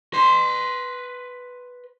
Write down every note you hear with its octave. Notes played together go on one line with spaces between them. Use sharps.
B4 C6